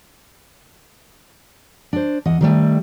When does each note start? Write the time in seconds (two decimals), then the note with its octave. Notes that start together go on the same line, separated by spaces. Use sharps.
1.93 D4 C5
2.26 E2 D#5 F#5
2.41 D#3 G3 A3